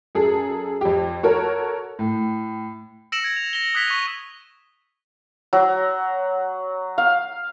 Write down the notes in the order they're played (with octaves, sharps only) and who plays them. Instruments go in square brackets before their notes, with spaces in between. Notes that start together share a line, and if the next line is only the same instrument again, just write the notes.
[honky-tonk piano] F#2 G#4 A4
F2 G4
F#4 A4 A#4 C#5
A2
[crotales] E6 A#6 C#7 D7 E7 F#7
G#6 D7
F7
A#6 G7
D#6 F#6 G#6 B6 F7 G7
C#6 D#7
[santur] F#3
F5